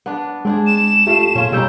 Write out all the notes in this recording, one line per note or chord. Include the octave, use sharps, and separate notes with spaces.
B3 D4
G#3 C4 D4 G#4
E7
A3 F4 G4 F5
A#2 C#4 F4 G#4
B2 G3 C#4 D#4 E6 G6